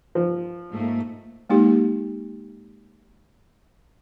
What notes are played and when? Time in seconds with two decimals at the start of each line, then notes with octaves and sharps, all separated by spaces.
0.15 F3
0.70 G#2 A3 A#3
1.50 G#3 A#3 D#4 G4